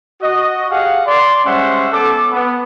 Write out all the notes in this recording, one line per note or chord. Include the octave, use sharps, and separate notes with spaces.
F#4 D#5
G4 G#4 F5 F#5
D5 C6
G3 G#3 C#4 C5 E5 F#5
B3 C#4 A4 D6
B3